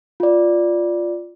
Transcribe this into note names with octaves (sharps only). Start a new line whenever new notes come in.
F4 D5